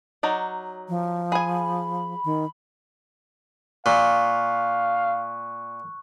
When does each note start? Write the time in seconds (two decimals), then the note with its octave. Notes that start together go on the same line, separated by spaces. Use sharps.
0.23 F#3 D#4 D5
0.89 F3
1.32 G#4 G#5 B5
2.25 D#3
3.86 A#2 F5 C#6 F#6